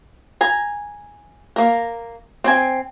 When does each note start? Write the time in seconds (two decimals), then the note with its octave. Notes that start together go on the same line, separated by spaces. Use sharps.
0.41 G#5 A#5
1.56 A#3 A#4
2.44 C4 G5 G#5